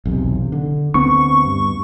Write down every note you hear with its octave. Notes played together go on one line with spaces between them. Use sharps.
B1 E2 C3
D3
D2 B3 C4 C#6
G2